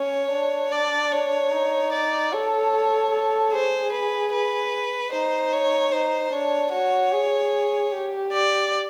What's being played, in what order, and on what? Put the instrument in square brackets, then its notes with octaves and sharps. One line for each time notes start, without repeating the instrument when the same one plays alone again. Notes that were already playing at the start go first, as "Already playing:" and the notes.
Already playing: [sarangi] C#4 [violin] C#5
[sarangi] D4
[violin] D5
C#5
[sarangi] D#4
[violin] D5
[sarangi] A4 [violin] C#5
[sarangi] A4
[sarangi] G#4 [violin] C5
[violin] B4
B4
[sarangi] D#4 [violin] C5
[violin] C#5
[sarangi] D#4 [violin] C5
[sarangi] D4 [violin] C#5
[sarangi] F#4 [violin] C#5
[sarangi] G#4
G4
[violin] D5